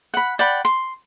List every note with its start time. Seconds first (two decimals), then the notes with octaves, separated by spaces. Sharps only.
0.14 F#5 B5
0.39 D5 F#5 G5 B5
0.65 C6